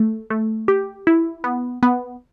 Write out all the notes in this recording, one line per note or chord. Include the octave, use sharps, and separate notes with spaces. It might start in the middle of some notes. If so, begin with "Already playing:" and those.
Already playing: A3
A3
G4
E4
B3
B3